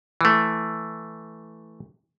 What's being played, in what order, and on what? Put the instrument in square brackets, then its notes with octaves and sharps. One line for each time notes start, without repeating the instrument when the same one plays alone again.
[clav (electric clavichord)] E3 A3